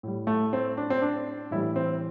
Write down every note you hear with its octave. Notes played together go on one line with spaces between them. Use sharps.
A2 G3
A3
C4
D4
C4
D4
A2 E3 G3 E4
C4